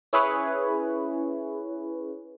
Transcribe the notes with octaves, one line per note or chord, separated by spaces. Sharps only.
C#4 E4 G#4 B4 C#5